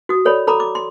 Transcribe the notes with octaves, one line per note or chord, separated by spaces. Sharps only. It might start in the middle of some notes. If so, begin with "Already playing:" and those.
F#4 D#6
A4 C#5 D5 B5
A4 A#5 B5 D6
D6
C6